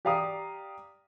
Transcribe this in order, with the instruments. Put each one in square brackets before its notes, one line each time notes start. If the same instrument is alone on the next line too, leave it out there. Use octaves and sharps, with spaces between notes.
[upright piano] G4 D5 F5 A#5 D#6